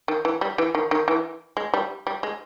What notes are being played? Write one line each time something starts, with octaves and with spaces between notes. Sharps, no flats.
D#3
E3
G3
E3
D#3
D#3
E3
G#3
G3
G3
G#3